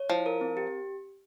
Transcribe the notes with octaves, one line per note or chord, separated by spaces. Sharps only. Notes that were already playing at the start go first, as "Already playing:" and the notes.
Already playing: C#5
F3 E4
A#4
C4
G4